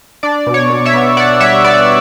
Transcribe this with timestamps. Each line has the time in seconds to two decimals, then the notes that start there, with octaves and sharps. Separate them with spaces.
0.23 D4 D5
0.47 B2
0.54 C#5
0.70 B2
0.85 C#5 E5
0.94 B3
1.17 B3 D5 F#5
1.40 G3 C#5 E5
1.64 B3 D5